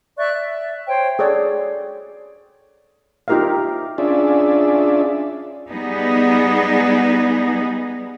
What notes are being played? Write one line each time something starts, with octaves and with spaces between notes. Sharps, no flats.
D5 E5 C#6 F#6
E5
C5 C#5 G5
G#4 A4 C#5 D5
D#4 F4 G4 A#4 E5 F5
C#4 D4 F4 G#4 D5 E5
G3 B3 D#4 G#4